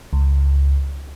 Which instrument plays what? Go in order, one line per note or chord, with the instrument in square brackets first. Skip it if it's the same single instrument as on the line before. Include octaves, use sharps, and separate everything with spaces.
[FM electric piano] C#2